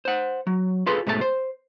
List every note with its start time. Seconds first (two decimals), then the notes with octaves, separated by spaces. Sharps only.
0.05 C5 F#5
0.47 F#3
0.86 F4 G#4 A4 B4 C6
1.07 G#2 B2 A3 F#4 A5
1.21 C5